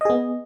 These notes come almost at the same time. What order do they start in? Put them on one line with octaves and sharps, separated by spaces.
D#5 G#4 B3